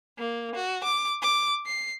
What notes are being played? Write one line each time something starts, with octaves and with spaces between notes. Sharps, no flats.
A#3
F#4
D6
D6
C7